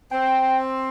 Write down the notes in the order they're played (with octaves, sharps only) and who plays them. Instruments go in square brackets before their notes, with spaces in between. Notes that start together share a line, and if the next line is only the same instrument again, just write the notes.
[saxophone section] C4 [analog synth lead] G5